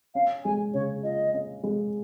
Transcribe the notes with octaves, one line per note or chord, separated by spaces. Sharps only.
C#4 F5
G#3 G#5
C#3 C#5
F4 D#5
C#4
G#3